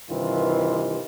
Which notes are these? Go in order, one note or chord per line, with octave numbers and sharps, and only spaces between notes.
G2 C3 D#3 E3 F4